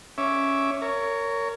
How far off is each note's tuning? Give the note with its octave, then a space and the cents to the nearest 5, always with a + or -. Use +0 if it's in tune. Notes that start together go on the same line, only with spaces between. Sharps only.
C#4 +0 E5 +0 D6 -5
A#4 -15 C#5 +15